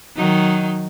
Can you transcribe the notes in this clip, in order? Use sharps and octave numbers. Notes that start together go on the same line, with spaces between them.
D#3 F#3 D#4